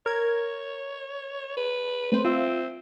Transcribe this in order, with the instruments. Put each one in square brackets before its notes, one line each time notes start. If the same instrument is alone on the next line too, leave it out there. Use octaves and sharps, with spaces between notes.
[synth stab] A#4 G#6 [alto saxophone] C#5
[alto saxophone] B4
[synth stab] A3 C4 C5 [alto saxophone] B4
[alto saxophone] C4 [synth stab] F4 E5